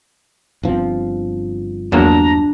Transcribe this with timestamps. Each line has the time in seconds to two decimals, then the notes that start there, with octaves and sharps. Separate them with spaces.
0.63 G1 F3 C4
1.92 E2 F#3 A#3 D4 A5 A#5